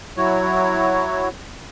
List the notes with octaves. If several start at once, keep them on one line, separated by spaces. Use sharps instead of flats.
F#3 E4 F#4 C#5